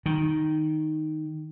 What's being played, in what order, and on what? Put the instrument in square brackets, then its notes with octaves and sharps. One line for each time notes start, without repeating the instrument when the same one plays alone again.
[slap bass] D#3